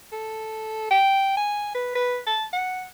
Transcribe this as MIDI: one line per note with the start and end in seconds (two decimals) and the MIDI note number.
0.12 0.88 69
0.91 1.32 79
1.37 1.73 80
1.75 1.95 71
1.95 2.18 71
2.27 2.44 81
2.53 2.86 78